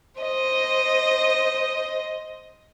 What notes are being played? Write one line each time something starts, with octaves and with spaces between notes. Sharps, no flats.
C5 D#5